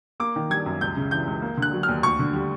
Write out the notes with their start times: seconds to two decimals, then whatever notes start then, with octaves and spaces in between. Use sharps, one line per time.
0.20 A#3 D6
0.36 D#3
0.50 G3 G#6
0.66 F#2
0.81 C#2 G6
0.97 C#3
1.11 E3 G6
1.27 C#2
1.42 A#3
1.58 D3 F#6
1.73 F#3
1.83 F6
1.89 D#2
2.03 D2 C#6
2.19 D3
2.33 G3